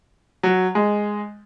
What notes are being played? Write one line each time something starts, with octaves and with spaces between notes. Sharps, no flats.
F#3
G#3